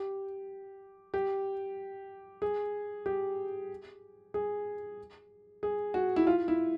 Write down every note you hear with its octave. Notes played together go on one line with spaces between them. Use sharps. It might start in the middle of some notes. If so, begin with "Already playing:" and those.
Already playing: G4
G4
G#4
G4
G#4
G#4
F#4
E4
F4
E4